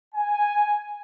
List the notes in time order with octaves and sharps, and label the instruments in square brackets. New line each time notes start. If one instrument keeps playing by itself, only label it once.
[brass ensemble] G#5